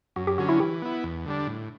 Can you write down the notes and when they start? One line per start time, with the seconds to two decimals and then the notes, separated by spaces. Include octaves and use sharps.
0.16 F#2 F#4
0.27 G4
0.38 D3 F#3 C#4 F#4
0.49 E4
0.60 E3 G4
0.82 B3 E4
1.04 E2
1.26 D3 G3 D4
1.47 A2